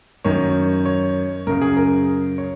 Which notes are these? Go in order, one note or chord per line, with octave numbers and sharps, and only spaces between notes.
F#2 D#3 C#5
C#5
F#2 C#3 A#4
G#4
A#4
C#5